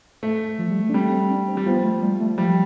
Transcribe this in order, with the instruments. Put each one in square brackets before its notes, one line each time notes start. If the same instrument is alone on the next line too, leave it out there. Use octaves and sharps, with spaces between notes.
[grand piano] A3
[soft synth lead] F3
G3
A3
D4
[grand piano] G3 [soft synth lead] C4
[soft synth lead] C4
D4
C4
[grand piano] G3
[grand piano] F3 [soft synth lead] B3
[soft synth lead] A3
G3
A3
[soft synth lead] F3 [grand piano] G3